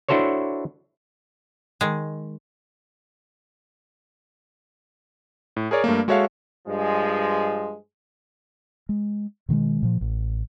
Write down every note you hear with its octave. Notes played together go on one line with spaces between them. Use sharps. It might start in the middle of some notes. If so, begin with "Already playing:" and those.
D4 E4 F#4 A4 C5 C#5
D#3 G#3
A2
G#4 A#4 C#5 D5
G2 A3 A#3
G#3 F#4 A4 C#5 E5 F5
G2 F3 G#3
G#3
B2 D#3 F#3 G#3
A#2 F3
A1